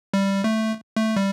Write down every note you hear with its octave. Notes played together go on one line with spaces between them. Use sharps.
G3
A3
A3
G3